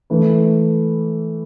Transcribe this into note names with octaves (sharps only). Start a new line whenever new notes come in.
E3 A3 E4 B4